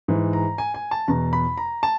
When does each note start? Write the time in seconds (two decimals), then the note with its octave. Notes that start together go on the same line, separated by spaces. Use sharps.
0.08 G#2 E3
0.33 A#5
0.58 G#5
0.74 G#5
0.91 A5
1.08 E2 B2 A#5
1.33 B5
1.57 A#5
1.83 A5